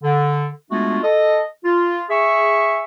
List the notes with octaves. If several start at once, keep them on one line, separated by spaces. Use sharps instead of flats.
D3
G#3 A3 B3 D4 F4 F#4
A4 D#5
F4
G#4 E5 C#6